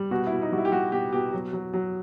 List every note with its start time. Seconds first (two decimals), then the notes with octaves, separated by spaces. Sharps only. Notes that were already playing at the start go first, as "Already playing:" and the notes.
Already playing: G3
0.11 B2 F#4
0.26 E4
0.32 B2
0.42 D#4
0.52 G3 F#4
0.58 E4
0.65 G4
0.72 G3 F#4
0.92 B2 G4
1.13 B2 G4
1.33 F#3
1.53 F#3
1.74 F#3